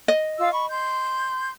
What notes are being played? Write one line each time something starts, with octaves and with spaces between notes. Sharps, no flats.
D#5
F4 F5 E6
B5 C#6
C6 G6